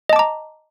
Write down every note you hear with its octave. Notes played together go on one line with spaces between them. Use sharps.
D#5 A5 A#5 D6